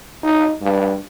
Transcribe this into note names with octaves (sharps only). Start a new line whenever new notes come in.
D#4
G2